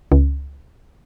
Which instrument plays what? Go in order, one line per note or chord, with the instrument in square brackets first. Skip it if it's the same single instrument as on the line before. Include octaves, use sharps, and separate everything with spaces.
[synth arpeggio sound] C#2